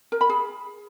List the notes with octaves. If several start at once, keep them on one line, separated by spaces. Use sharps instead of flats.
A#4
B5
G#4